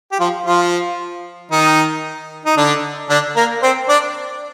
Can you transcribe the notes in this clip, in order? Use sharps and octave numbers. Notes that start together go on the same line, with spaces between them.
G4
F3 F4
F3 F4
D#3 D#4
D#4
D3 D4
D3 D4
A#3 A#4
C4 C5
D4 D5